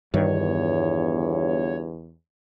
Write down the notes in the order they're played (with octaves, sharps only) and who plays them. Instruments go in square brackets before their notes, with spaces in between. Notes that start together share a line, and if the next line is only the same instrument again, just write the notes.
[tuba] G1 [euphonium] E2 [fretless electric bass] G2 D#3 [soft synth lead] C#5